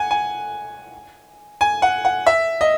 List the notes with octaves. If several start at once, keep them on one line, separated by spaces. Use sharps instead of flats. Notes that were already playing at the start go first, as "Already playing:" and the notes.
Already playing: F#5 G#5
G#5
G#5
F#5
F#5
E5
D#5